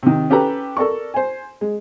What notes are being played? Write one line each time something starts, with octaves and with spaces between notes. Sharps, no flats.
C3 D#3
C#4 G4 A4 B4 A#5
A4 A#4 D5 C#6
C5 G#5
G#3